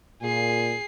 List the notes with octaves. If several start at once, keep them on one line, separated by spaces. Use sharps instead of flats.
A#2 G#4 C7